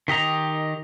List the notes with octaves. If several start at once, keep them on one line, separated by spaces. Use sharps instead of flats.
D#3 G4 D#5 A#5